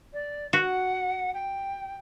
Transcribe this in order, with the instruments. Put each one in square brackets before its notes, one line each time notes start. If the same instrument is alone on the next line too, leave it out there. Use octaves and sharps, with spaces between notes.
[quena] D5
[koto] F#4 [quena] F#5
[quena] G5